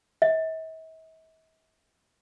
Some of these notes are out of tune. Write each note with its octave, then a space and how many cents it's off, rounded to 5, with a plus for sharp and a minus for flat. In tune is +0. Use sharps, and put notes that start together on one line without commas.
E5 -45